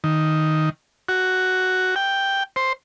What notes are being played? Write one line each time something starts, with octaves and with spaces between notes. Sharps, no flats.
D#3
F#4
G5
C5